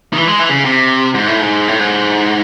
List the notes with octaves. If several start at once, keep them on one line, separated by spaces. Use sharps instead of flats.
D#3
E3
G#3
E3
C#3
C3
G#2
A2
G#2
A2
G#2